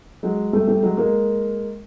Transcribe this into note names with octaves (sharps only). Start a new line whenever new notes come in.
F#3 G#3
G3 A3
G3 A3
F#3 G#3
G#3 A#3